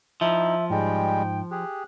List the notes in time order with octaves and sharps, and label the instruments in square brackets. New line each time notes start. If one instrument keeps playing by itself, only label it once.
[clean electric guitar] F3 [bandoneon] D#4 E4 [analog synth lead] E5
[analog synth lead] G#2 [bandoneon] G3 G#3 [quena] G5
[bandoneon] G4 G#4 [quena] F#6